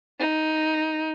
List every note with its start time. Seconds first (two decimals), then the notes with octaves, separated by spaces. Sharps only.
0.19 D#4